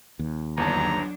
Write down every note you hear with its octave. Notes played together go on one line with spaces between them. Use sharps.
D#2
G1 E2 F#3 D4 A5 A#5